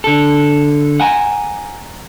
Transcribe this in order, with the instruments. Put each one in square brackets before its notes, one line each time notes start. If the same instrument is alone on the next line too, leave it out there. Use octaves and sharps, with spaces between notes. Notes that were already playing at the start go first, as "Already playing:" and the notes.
[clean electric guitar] D3 A4
F#5 G#5 A#5